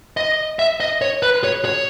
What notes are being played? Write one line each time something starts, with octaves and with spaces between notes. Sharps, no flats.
D#5
E5
D#5
C#5
B4
C#5
C#5